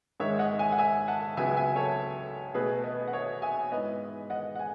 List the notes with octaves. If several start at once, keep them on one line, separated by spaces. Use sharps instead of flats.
G#2 D#3 G#3 C#5 E5
D#5 F#5
E5 G#5
F#5
E5 G#5
F#5 A5
C#2 C#3 F#3 B3 E5 G#5
E5 G#5
A4 C#5
B2 A3 G#4 B4
B4 D#5
F#5
C#5 E5
E5 G#5
G#2 E3 G#3 B3 B4 D#5
D#5 F#5
F#5
G#5